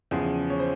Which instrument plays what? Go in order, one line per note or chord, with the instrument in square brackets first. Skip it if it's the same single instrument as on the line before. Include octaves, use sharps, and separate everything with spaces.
[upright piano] E2 C#3 F3 G#4
C#5
C5